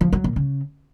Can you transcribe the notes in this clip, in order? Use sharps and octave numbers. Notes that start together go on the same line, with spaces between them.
F3
F#3
A#2
C#3